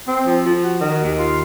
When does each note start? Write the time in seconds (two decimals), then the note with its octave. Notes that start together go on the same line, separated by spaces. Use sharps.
0.08 C4
0.26 F3
0.45 F3
0.63 F#4
0.82 D#3
1.00 D#2
1.18 F4